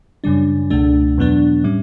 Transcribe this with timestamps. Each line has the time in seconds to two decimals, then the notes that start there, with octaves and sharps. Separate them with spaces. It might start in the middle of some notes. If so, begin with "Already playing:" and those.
0.24 F#2 C#3 G3 D4
0.70 C#2 B2 A3 D4
1.18 E2 B2 F#3 B3 D4
1.64 A2 G3 C#4